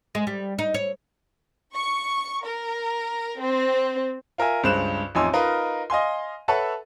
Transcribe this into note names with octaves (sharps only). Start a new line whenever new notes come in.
G#3
G3
D#4
C#5
C#6
A#4
C4
F4 A#4 E5 G#5
C#2 G2 G#3 C5 F#6 E7
A1 F2 D#4 G#5 C6 E6
D#4 F4 A#4 B4 D#5
D#5 F5 G#5 C6
A4 B4 C#5 E5 F#5 A5